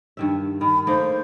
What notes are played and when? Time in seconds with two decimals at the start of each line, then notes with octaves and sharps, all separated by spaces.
0.17 G2 D#3 E5
0.61 D#3 B5
0.87 A3 A#3 D#4 C5